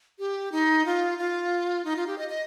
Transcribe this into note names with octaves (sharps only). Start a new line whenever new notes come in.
G4
D#4
F4
F4
D#4
F4
G4
D#5
D#5